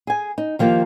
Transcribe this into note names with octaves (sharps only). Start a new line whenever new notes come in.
G#4 G#5
D#4
D#3 F3 A#3 G4